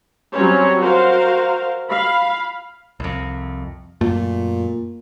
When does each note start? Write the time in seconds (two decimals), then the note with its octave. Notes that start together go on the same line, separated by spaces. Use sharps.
0.33 F#3 G3 C4 C#4 C5 C#5
0.79 F#4 A#4 C5 F5
1.89 F5 B5
3.00 C2 F2
4.01 F#2 A#2 A3